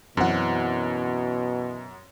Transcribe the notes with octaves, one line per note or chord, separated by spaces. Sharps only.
F#2 B2 E3 C4 C#4 F#5